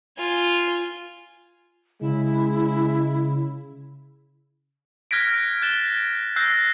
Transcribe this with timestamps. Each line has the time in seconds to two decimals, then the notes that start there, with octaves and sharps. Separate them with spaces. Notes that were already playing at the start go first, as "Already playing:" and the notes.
0.18 F4 G#5
2.01 C#3 G#3 E4
5.11 F6 F#6 G#6 A#6 B6 D7
5.62 F#6 A6 E7 G7
6.36 E6 F#6 G6 A#6 C7